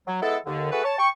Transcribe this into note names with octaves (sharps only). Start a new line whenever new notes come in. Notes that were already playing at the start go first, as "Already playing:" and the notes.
F#3
G#3 B3 E4 A4
D#2 D3
A3 F#4 G#4 A4 B4
C#5 A5
G5 C#6